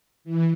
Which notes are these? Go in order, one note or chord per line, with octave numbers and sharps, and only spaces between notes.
E3